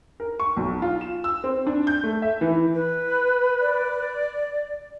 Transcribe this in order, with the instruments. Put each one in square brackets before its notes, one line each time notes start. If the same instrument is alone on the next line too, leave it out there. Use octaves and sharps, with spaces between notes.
[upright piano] A#4
C#6
B1
F4
E7
E6
C4
D4
G6
A3
E5
E3
[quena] B4
[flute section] D5